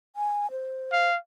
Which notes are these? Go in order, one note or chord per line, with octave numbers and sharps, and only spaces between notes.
G#5
C5
F5